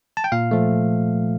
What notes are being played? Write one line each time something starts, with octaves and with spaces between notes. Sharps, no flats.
A5
G5
A#2 F5
F3 A3